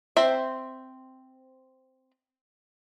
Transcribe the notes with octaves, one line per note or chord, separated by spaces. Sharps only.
C4 C5 E5